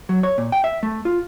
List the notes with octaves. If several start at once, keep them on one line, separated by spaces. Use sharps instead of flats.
F#3
C#5
A#2
G5
E5
A3
F4